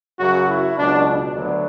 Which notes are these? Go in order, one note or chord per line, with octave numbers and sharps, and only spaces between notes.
F#2 C#3 F#3 F#4
E4
C#2 B2 F#3 D4
D4
D2 D3 F#3 B3